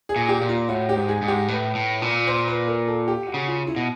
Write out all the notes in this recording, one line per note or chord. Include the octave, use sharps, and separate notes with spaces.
G#4
A#2
G4
A#2
F4
A2 F#4
G4
G#2
G#4
G#2
G4
A2 B4
A2
A#2
C5
B4
A#4
A4
G4
F#4
C#3
F4
E4
B2